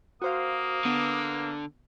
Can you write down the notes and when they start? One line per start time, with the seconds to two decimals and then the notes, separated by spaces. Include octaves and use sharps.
0.22 A#3 F#4 C5 F5 D#6
0.85 D3 B3